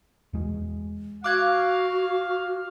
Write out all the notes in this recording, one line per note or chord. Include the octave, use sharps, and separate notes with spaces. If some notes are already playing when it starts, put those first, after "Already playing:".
E2 G#3
F#4 F5 D6 F#6 G#6